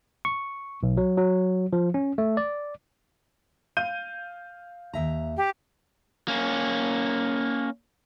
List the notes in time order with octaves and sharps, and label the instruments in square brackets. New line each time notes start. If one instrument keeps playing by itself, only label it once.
[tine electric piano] C#6
B1
F#3
F#3
F3
C#4
A3
D5
[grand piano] F5 G6 D#7
[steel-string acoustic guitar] D#2 E5 A#5
[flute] G4
[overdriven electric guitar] A#3 C#4